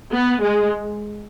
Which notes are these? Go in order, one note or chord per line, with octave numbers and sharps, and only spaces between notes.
B3
G#3